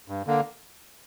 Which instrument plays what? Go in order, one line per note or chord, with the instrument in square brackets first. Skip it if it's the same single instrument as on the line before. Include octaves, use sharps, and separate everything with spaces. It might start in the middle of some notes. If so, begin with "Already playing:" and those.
[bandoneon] G2
D3 A#3